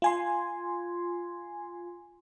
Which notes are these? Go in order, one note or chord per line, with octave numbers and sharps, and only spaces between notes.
F4 G#5 C6